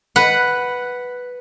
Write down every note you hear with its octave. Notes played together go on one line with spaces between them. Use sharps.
B4 F#5